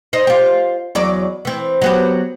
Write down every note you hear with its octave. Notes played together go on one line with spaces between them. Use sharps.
D#4 C5 D#5
F4 G4
E2 F#3 D5
E3 C4
F#3 B3 G4